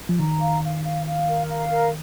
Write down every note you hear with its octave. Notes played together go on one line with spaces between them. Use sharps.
F3
D#3 A#5
F5
F5
F5
F5
A#4
F5
A#4